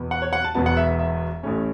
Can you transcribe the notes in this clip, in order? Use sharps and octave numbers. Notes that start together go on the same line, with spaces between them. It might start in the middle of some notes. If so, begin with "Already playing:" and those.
Already playing: E2 B2 B3
F#5
C#5
F#5
A5
E1 E2 B2 B3 A5
F#5
E5
E5
A1 A2 A3 C#4